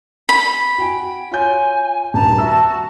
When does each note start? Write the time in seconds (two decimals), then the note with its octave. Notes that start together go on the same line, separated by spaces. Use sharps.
0.29 B5
0.78 F#4 G5 G#5
1.32 F4 C#5 G#5 G6
2.14 D#1 G2 A5 A#5
2.38 F#4 E5 A#5 E6